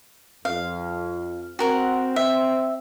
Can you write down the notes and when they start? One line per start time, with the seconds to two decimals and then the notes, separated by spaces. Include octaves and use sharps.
0.45 F2 F5
1.59 C4 F#4 A#4 F#5
2.16 E5